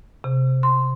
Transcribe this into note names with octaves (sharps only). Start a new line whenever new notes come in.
C3
C6